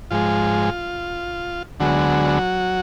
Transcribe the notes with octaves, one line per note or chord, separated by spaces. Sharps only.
G#2 F3 G#3 F4
D2 D3 F#3 G#3 B3 F#4